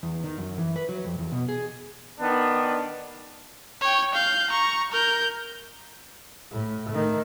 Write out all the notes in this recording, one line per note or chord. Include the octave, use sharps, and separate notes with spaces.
E2
D#3
F#2
E3
B4
F#3
F2
E2
B2
G#4
D#3 B3 D4
C#5 G5
F5 G6
A#5 C#6
A#4 G6
A2
D#3 A3